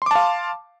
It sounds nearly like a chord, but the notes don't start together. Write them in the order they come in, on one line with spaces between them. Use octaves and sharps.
C6 D6 A5 F5